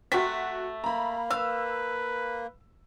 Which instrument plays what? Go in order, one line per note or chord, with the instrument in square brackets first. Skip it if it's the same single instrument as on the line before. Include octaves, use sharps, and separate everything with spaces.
[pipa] C3 A3 [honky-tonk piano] F#4 B6
[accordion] A#3 [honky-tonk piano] A#5 B5
[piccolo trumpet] B4 [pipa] F5 [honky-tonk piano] E6